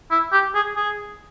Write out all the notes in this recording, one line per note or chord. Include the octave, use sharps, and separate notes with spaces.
E4
G4
G#4
G#4